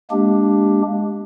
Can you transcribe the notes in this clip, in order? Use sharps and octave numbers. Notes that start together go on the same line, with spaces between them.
G#3 A#3 D4 G4